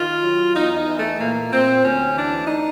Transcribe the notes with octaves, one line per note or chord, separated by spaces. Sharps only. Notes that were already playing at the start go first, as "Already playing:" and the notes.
Already playing: D#3 F4
F#3
E2 D#4
D#4
E3
A3
A#2 A#3
A#2 C4
D2 C#4
E3 D4
D#4